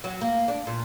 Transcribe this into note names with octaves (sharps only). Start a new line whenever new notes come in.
F#3
A#3
D4
A#2